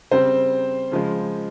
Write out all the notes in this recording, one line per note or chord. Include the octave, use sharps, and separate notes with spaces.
C#3 G3 C4 C5
C#3 F3 G#3